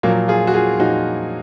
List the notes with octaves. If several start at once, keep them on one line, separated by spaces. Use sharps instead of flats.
A#2 F3 F#3 A#3
F4 G#4
F#4
F4 G#4
A#2 F3 D#4 F#4